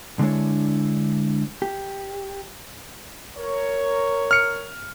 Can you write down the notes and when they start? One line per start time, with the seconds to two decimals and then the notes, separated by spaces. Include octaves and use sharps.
0.19 D3 G#3 D4 E4 C#5
1.62 G4
3.37 A#4 C#5
4.31 F6 C#7